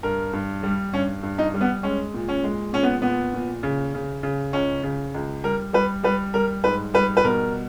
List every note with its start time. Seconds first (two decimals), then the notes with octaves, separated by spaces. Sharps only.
0.03 G2 A#4
0.33 G2
0.63 G3
0.93 G2 C#4
1.23 G2
1.38 D#4
1.54 G3
1.61 B3
1.83 G#3 C#4
2.14 A#2
2.28 C#4
2.44 G#3
2.73 A#2 C#4
2.83 B3
3.02 A#2 B3
3.34 A#2
3.63 C#3
3.94 C#3
4.23 C#3
4.53 C#2 C#4
4.83 C#3
5.14 C#2
5.44 G3 A#4
5.73 G3 B4
6.03 G3 B4
6.34 G3 A#4
6.64 G#2 B4
6.94 G3 B4
7.17 B4
7.24 B2 A#4